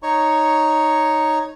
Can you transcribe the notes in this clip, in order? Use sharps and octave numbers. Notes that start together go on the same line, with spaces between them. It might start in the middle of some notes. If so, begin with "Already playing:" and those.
D#4 C#5 C#6